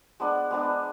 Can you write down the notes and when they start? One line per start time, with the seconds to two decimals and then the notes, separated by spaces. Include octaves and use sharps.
0.20 G#3 B3 D4
0.51 G#3 B3 D4